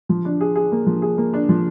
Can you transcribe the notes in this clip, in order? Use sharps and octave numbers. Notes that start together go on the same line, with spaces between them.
F3
D4
G#4
G#4
A#3
F3
G#4
A#3
D4
F3